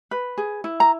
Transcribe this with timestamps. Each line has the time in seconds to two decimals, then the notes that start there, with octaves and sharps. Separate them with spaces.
0.11 B4
0.38 G#4
0.64 E4
0.80 A#5